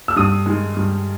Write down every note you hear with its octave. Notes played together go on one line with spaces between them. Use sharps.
E6
G2 D#6
D#3 G#3
G2